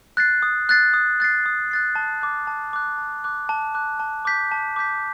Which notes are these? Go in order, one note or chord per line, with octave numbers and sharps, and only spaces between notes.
F#6 A6 C7
D#6
F#6 A6 C7
D#6
F#6 A6 C7
D#6
F#6 A6 C7
A5
D6 F#6
A5
D6 F#6
A5
D6 F#6
A5
D6 F#6
A5
D6 G6 B6
A5
D6 G6 B6